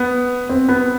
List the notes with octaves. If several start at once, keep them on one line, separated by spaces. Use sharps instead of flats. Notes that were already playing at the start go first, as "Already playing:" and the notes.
Already playing: B3
C4
B3